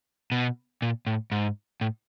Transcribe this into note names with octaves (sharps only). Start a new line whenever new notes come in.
B2
A#2
A2
G#2
A2